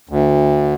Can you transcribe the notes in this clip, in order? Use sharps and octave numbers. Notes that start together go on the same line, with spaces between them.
D2